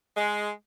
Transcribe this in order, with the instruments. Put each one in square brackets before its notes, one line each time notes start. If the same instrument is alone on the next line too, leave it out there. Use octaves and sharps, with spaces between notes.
[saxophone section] G#3